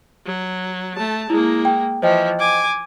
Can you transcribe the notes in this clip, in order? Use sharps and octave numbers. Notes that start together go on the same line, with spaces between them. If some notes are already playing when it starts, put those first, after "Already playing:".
F#3
A3 A5
G#3 A#3 E4
G5
E3 F3 C5 D#5 G5
G#5 D6